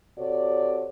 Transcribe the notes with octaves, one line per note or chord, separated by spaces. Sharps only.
C3 F#4 A4 C#5 D5